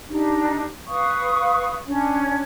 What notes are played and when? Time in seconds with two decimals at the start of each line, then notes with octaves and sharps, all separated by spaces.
0.08 D4 D#4 G4
0.87 B4 F5 C#6 D#6
1.86 C#4 D4